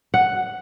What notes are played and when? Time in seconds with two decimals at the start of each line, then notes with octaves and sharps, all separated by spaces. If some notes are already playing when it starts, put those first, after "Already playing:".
0.14 F#5